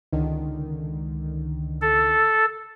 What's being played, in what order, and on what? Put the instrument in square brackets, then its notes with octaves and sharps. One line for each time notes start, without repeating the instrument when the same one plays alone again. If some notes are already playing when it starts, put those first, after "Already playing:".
[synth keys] C#2 D3 D#3
[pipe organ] A4